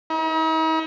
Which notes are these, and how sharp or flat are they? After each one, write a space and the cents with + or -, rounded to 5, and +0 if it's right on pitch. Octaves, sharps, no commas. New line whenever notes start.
D#4 +45